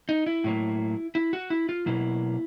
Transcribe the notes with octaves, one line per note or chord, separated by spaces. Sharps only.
D#4
E4
A2 F#3 A#3
E4
F#4
E4
F4
B2 F#3 A#3 E4